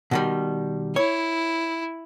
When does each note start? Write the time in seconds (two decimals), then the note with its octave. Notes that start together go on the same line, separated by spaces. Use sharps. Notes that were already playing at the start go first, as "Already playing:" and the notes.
0.11 B2 D#3 G3
0.96 E4 C#5